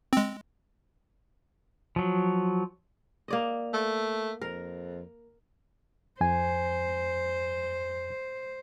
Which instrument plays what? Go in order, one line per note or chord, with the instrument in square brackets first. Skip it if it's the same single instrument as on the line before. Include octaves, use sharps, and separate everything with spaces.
[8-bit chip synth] G#3 C4
[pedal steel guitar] F3 F#3
[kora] A#3 D5 D#5
[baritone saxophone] A3
[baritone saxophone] F2 [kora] A#4
[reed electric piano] F2 G#5 [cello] C5